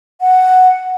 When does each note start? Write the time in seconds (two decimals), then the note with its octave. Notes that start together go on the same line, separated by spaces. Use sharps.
0.21 F#5